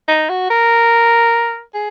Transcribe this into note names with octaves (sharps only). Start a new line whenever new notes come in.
D#4
F#4
A#4
G#4